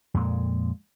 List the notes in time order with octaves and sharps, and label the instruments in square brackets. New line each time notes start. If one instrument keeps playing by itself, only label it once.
[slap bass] F2 A#2 G#3